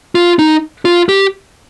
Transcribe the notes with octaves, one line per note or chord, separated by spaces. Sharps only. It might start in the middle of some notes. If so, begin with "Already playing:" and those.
F4
D#4
F4
G4